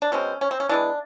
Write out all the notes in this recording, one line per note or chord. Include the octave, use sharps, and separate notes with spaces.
D4
B2 G#3 C4 C#4
C#4
C4
C#4
E3 G#3 B3 D4